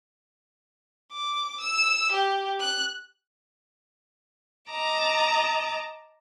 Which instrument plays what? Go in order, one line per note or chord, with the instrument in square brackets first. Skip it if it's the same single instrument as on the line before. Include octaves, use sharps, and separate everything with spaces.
[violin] D6
E6
G4
F#6
[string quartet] D#5 A5 A#5 D6